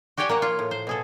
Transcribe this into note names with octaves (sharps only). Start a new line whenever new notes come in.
F#4 G4 C#5 D5 G5 G#5
A#3 C#5 F#5
F4
A2
C5
B2 G#4 A4